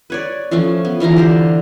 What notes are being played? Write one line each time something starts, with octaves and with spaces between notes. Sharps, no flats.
B4 C#5 D5
F3 A3 C#4 F4
B3
D3 E3 F4 A#5
G4 C5 D5